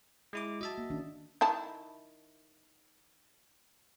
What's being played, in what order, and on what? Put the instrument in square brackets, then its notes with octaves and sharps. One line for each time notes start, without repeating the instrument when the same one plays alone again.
[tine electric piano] G#3 E4 D6
[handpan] F#4 [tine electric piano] D#5 E5 A5
[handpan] A#3
D#3 C#4 D4
[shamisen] D#3 E4 A5